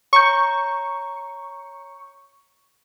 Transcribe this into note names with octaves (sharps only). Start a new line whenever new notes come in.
C#5 A#5 C#6 G6